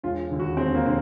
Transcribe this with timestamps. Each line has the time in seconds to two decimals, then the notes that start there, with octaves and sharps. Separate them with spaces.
0.04 E1 F4
0.30 D#2 D3
0.40 F#4
0.57 E1 C4
0.75 A#3
0.86 D3